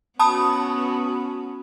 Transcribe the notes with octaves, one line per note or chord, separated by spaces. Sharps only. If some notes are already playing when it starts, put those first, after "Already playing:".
B3 C#4 F#4 A5 B5 D#6